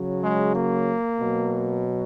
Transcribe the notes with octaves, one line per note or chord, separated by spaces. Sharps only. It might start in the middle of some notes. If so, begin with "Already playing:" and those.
Already playing: C#3 F#3
G#3
A#3
B2 F#3